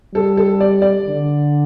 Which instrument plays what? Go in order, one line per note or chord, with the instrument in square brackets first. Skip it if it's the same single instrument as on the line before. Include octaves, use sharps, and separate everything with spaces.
[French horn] G3 [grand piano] A4
[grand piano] A4
D5
D5
[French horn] D3